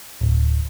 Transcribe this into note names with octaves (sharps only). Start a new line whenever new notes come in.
D1